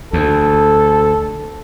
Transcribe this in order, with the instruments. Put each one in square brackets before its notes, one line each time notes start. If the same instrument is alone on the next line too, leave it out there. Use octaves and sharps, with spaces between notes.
[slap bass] D2 [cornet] A4